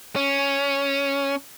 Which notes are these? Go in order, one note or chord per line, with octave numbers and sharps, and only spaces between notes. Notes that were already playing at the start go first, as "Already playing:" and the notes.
C#4